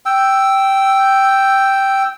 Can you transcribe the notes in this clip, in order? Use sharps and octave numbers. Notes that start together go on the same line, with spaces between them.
G5 E6